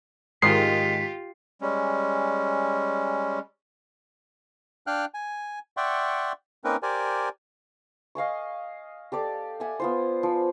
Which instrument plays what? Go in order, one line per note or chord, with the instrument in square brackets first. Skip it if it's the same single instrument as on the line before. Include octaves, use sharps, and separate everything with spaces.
[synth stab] G#2 D#3 G#3 [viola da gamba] F4 G4 [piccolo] B6 [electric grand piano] C7
[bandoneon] G3 G#3 C#4
[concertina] D4 F5 G5 F6 F#6
G#5
D5 E5 F#5 G5 C6 C#6
A#3 C4 C#4 D#4 A#4 B4
G4 A#4 C5 D5 G#5
[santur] D#5 F5 G#5 C#6
G4 A4 D5 D6
E5 F#5 G#5
B3 F4 C5
F3